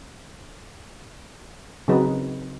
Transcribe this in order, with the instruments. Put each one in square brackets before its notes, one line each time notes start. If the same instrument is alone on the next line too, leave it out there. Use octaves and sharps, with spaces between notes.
[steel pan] C#3 F#3 C4 D#4 G#4 B4